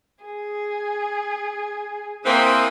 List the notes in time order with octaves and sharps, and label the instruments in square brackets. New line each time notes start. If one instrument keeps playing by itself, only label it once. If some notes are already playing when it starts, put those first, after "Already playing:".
[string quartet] G#4
[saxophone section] E3 A#3 C4 [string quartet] D#6